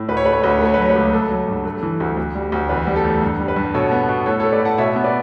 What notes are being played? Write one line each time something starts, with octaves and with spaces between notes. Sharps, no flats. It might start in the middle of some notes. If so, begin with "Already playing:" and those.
Already playing: A2
D2 B4
C#5
A3 B4
C#5
D2 B4
C#5
B4
A3 C#5
B4
F#3 C#5
B4
C#2
A3 A4
F#3
G2
A3
E3
D2
D2
G3
D2
E2 B4
G3
A4
E2
G2
G3
B4
G2
B2 A4 C#5
B3
B2
A2 A4 C#5
A4 C#5
A3
B4 D5
A2 F#5 A5
B2 C#5 E5
B3
B4 D5